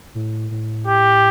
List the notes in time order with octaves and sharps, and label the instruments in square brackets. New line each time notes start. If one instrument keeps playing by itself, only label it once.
[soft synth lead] A2
A2
[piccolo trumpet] G4